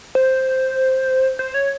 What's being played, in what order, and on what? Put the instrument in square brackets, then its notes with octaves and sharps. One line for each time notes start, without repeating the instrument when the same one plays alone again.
[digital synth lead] C5
C5
C#5